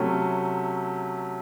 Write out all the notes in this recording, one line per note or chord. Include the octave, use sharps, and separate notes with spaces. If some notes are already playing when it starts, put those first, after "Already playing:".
Already playing: C3 F#3 A3 C#4